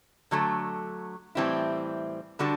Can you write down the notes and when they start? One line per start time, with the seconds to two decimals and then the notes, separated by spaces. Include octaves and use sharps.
0.31 D3 F#3 A3
1.35 A2 E3 G3 C4 E4
2.39 D3 G3 D4 F#4